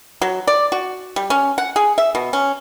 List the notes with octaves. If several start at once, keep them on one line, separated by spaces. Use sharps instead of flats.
F#3
D5
F#4
G3
C#4
F#5
G#4
E5
B2
C#4